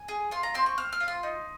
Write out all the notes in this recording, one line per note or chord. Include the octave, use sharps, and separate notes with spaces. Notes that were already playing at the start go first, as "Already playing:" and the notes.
Already playing: G#5
G#4
F4 C6
A#5
C4 C6
C#6
C4 F6
F6
F4
C6
D#4